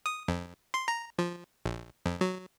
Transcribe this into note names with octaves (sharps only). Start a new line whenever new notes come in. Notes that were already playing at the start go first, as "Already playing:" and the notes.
D#6
F2
C6
A#5
F3
A#1
F2
F#3